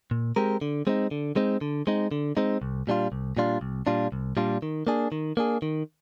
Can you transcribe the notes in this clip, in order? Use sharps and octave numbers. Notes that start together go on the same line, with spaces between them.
A#2
G#3 C4 G4 A#4
D3
G#3 C4 D#4
D3
G#3 C4 D#4
D3
G#3 C4 D#4
D3
G#3 C4 D#4
C2
A#2 G3 D4 F4
C2
A#2 G3 D4 F4
C2
A#2 G3 D4 F4
C2
A#2 G3 D4 F4
D#3
A#3 D4 G#4
D#3
A#3 D4 G#4
D#3